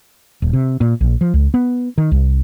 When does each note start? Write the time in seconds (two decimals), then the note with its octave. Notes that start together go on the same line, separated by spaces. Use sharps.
0.42 D#1
0.53 C3
0.81 A#2
1.01 A#1
1.21 F3
1.34 C#2
1.54 B3
1.98 D#3
2.11 C2